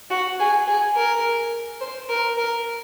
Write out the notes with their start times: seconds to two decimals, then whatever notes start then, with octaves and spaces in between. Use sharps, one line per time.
0.10 F#4
0.39 G#4
0.67 G#4
0.95 A#4
1.81 C5
2.09 A#4
2.37 A#4